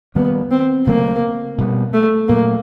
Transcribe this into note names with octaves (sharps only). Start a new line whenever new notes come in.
D#3 G3 A#3 B3 C#4
C4
C#3 F#3 A3 A#3 C4
B2 G3 B3
A3
A#2 F#3 A3 A#3